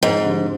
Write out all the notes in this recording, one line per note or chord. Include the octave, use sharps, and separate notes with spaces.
F2 G#2
D3 G3